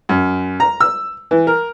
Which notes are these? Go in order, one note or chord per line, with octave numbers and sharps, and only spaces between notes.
F#2
A#5
E6
E3
A#4